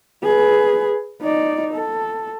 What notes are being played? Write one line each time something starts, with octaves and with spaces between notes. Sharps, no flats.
G#4 B4
D#4 D5
A4